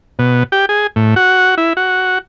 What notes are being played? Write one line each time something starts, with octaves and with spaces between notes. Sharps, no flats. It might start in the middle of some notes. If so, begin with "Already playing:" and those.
B2
G4
G#4
A2
F#4
E4
F#4